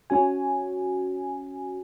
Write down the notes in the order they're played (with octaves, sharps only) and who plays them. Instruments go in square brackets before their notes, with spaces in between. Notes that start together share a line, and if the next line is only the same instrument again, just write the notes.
[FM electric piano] C#4 F#4 G#5